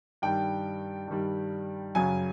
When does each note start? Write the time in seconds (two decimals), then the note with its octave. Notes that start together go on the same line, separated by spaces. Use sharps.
0.22 G2 D#3 G3 G5
1.08 G2 D#3 G3
1.95 F#2 C#3 F#3 G#5